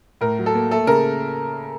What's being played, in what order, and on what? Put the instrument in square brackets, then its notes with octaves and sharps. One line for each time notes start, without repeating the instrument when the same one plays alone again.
[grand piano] A2 A#4
F#3
A4
A#3
A3 A4
C#3 A#4